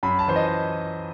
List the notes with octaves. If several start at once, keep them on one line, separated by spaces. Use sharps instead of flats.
F#2 B5
A5
E3 C5
D#5